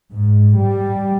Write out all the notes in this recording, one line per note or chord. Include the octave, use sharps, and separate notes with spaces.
G#2
G3